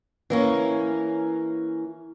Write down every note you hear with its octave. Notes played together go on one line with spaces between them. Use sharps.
E3 A#3 C#4